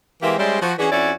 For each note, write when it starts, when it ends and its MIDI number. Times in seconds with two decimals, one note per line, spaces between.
0.23 0.36 52
0.23 0.36 56
0.23 0.36 58
0.23 0.36 60
0.23 0.36 67
0.23 0.36 76
0.38 0.57 55
0.38 0.57 56
0.38 0.57 61
0.38 0.57 72
0.38 0.57 74
0.38 0.57 76
0.61 0.73 53
0.61 0.73 66
0.61 0.73 72
0.79 0.89 52
0.79 0.89 61
0.79 0.89 62
0.79 0.89 66
0.79 0.89 68
0.91 1.11 41
0.91 1.11 61
0.91 1.11 64
0.91 1.11 66
0.91 1.11 73
0.91 1.11 74